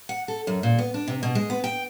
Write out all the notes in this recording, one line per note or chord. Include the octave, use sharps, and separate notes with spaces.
F#5
A4
F#2
A#2
B3
D4
C3
B2
G#3
B3
G5